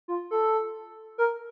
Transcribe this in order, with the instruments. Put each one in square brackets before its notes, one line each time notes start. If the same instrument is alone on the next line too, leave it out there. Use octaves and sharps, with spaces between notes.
[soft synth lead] F4
A4
A#4